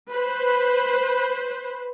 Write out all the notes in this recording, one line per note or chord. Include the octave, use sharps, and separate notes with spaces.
B4 C5